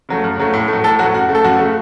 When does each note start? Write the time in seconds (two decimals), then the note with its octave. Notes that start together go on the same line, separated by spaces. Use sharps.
0.09 C#3 F#3 A3
0.24 F#2
0.38 C#3 F#3 A3
0.53 A2
0.68 F#3 A3
0.84 A2 A4
0.99 F#3 A3 F#4
1.14 F#2 F#4
1.29 C#3 A3
1.35 A4
1.44 F#2 F#4
1.59 C#3 A3